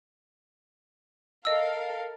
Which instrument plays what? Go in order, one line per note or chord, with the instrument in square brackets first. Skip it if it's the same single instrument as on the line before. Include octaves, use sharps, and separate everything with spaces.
[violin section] A4 A#4 F5 [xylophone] D#5 E6